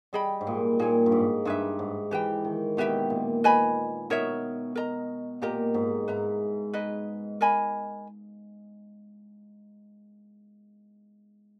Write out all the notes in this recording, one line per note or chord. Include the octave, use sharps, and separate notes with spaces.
G3 G#4 D#5 G5 B5
G#2
A#2
A#2 D#4 G#4 C#5 G#5
G2
G#2
G2 D#4 G#4 B4 E5
G#2
E3 G4 B4 G5
D#3
B2 G4 B4 E5 G5
A#2
B4 D#5 G#5 B5
B2 D#4 A#4 C#5 E5
A#4 D#5 A#5
A#2 G4 A#4 D#5 A#5
G#2
G#2 B4 E5 A#5
D#4 G#4 B4 D#5
A#4 D#5 G#5 B5